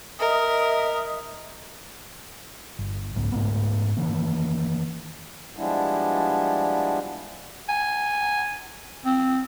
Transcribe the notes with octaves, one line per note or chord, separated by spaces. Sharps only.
A#4 D#5 E5 D#6
G1
C2 G#2
G#2 A3 B3
D#3 E3 A#3 C#4
F3 G3 G#3 B3 D4 E4
G#5
C4